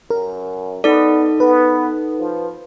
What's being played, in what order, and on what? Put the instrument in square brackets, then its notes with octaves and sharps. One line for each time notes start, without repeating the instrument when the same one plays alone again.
[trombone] F#2 [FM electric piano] A#4
[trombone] B3 [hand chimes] D#4 A4 [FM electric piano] D5
[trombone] B3 [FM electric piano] B4
[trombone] F3